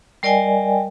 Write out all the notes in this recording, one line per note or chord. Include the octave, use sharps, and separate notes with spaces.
G3 A#4 D5 D#5 G5 G#5